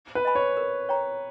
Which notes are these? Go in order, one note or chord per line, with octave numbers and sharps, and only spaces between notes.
B4
D#5 G#5 B5
C#5
A#4
C#5 G5 A#5